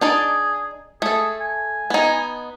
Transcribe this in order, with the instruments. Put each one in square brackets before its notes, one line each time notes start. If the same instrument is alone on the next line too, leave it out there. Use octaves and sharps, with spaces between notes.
[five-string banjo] D4 D#4 D5 [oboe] G#4
[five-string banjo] A3 A4 [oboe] G#4
[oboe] G#5
[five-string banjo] B3 D#4